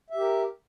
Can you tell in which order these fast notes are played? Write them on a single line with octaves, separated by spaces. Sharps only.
E5 G4 A#4